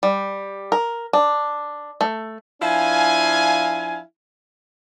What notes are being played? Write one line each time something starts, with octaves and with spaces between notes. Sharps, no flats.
G3
A#4
D4
A3
F3 D4 E4 F5 G#5